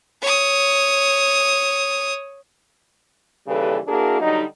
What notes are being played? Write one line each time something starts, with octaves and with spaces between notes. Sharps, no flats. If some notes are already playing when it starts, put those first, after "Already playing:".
C#5 D#6
D#2 C#3 E3 G3 A4 B4
A#3 D4 E4 F#4 G#4 A#4
D3 F#3 G3 D#4